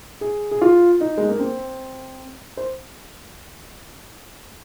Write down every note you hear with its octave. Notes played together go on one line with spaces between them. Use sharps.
G#4
G#4
F4
D#4
G#3
A#3
C4
C5